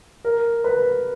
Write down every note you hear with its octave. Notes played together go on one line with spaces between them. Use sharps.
A#4
B4